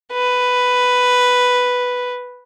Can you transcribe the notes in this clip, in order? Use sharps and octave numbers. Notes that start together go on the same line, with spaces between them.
B4